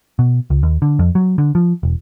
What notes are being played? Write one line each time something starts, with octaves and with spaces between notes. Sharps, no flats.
B2
C#2
D#2
D3
F2
F#3
D3
F3
E1